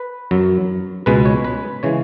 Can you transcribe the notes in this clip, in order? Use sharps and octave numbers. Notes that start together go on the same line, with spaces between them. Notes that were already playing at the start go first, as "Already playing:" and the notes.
Already playing: B4
F#2 F#3
C#2 B2 G#3 B4
C#5
B4
C#3 E3 G#3 C#5